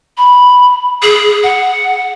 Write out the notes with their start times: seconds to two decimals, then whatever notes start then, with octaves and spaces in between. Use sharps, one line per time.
0.17 B5
1.02 G#4
1.43 F#5